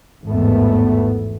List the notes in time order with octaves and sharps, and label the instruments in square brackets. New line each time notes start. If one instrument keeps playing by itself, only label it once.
[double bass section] G#1 E2 A2 A3 B3